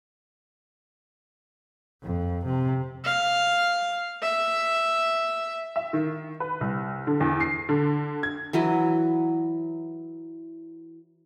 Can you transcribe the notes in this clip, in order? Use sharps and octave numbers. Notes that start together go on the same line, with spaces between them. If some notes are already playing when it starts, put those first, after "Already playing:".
F2
C3
F5
E5
E5
D#3
B4
C2
D3
E2
C7
D3
G#6
E3 F#3 E4 D#5